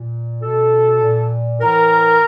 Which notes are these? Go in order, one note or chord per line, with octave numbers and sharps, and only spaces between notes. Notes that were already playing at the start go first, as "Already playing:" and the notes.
Already playing: A#2
B2 A4
A#2
A2 E3 A#4